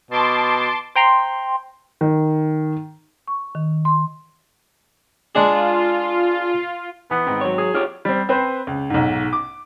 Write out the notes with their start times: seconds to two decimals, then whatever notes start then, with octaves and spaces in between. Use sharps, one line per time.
0.11 B2 A5 C6 D6
0.95 C5 G5 A#5 C6
2.01 D#3
3.28 C#6
3.55 D#3
3.85 C6
5.35 G#3 D4 F4 G#4
7.11 E3 B3
7.27 G#2 D#3 C4
7.41 F#3 C#5
7.58 G#4
7.75 F4 G4 C#5 D6 F6
8.05 G3 C4
8.29 C4 B4 C5
8.67 C#2
8.90 B1 G#2
9.33 D6